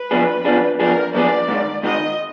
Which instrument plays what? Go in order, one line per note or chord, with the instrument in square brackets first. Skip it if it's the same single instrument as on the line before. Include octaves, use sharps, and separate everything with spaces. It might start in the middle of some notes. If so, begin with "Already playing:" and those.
Already playing: [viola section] B4
[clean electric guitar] F2 F3 B3 D4 G#4
F2 F3 B3 D4 G#4
[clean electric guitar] F2 F3 B3 D4 G#4 [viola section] A#4
[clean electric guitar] F2 F3 B3 D4 G#4 [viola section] D5
[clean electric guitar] G#2 D#3 G#3
[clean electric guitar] G#2 D#3 G#3 [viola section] D#5